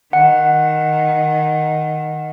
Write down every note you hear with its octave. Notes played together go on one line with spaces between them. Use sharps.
D#3 F#5